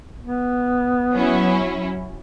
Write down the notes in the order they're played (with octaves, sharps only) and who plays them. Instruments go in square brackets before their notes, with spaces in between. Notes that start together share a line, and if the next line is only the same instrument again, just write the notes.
[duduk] B3
[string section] F#3 C#4 E4